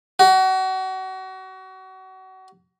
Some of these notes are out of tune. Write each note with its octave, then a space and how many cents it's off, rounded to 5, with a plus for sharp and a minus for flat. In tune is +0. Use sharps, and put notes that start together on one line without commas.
F#4 +30